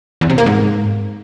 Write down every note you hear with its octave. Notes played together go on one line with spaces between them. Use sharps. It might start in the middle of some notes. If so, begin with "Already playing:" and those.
E2
C3
A#3
G#2